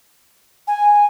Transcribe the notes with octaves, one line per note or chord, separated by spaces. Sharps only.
G#5